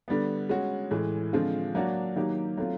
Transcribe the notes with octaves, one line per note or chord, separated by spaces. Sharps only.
D3 G3 B3
G#3 C#4 F#4
A2 E3 G#3
D3 F3 G#3 C4 F4
F#3 A#3 D4 F#4
D#3 F#3 A#3 D#4 G4
F#3 A3 C4 F4